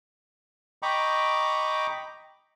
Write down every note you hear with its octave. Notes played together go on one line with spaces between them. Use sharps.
D#5 G5 A#5 B5 C#6 D6